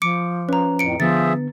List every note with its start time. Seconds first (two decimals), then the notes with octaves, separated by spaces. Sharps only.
0.02 F3 D6 C#7 D7
0.49 C#4 B4 A#5
0.79 F2 A2 C#7 D7
1.00 D3 F3 B3 G#4 E5 A6